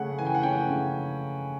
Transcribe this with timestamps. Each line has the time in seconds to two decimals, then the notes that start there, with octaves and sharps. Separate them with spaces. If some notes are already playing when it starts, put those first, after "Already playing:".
Already playing: C#3 A3 C#4 F#5
0.19 E3 G#5
0.26 G5
0.35 F#5
0.43 C#4 G5
0.69 C#3